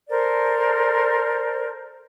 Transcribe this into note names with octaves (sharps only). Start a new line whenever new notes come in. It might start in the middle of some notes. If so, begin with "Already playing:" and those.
A4 A#4 C5 D5